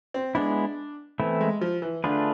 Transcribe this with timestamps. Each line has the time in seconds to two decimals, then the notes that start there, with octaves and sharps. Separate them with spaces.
0.14 C4
0.35 G#3 B3 D4 E4
1.19 E3 A3 B3 C4 E4
1.41 G#3
1.61 F3
1.82 E3
2.04 D3 A3 D4 F4 G#4 B4